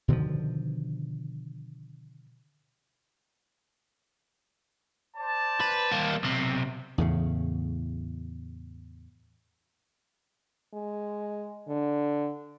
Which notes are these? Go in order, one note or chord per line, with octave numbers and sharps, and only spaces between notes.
B2 D3 D#3 F3
C5 D5 A5
B4
G3 A#3
B1 C3
E2 A2 C#3
G#3
D3